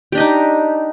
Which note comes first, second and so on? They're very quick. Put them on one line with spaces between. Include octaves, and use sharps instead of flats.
G4 D4 D#5 D#4